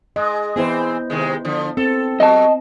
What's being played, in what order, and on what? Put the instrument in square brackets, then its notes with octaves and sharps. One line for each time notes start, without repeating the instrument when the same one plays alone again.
[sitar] G#3 [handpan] D#5
[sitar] E3 C4 G#4 [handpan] B3 E4 C5
[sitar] C3 D#3 G#3
D3 F3
[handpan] C4 [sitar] A4
[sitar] F#3 F#4 [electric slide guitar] D#5 A5